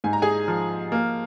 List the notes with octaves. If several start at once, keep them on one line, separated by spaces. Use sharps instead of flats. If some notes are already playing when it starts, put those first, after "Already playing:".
G#2 G#5
A#5
G#4 G#5
F3
A#3